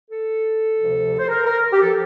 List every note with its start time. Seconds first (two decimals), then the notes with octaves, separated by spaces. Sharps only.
0.10 A4
0.78 D2 C3 F3
1.19 C5
1.29 A#4
1.46 A#4
1.73 G4
1.81 F3 A4